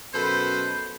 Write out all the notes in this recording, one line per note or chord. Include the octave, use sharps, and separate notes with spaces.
F#2 B2 A4 B4 C5